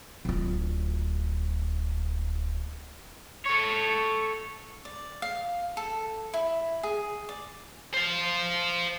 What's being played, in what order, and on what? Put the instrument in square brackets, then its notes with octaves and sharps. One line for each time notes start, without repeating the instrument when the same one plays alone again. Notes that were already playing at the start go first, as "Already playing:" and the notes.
[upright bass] D1 F4
[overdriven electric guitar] A4 C#5
[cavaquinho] D5
F5
A4
E4
G#4
D5
[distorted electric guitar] C5 F5